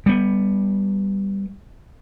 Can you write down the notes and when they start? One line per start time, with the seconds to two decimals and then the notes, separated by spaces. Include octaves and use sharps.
0.06 G3 B3